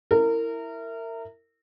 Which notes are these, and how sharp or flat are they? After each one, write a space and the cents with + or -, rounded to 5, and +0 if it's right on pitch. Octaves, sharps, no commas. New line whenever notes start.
E4 +0 A#4 -25